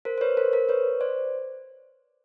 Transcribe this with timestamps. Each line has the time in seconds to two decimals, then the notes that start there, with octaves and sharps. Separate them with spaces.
0.05 A#4 C5
0.18 C5
0.21 B4 C#5
0.37 A#4 C5
0.53 A#4 C5
0.69 B4 C#5
1.01 C5 D5